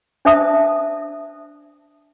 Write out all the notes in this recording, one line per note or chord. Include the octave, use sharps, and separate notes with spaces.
D4 C5 D5 E5 A5 D#6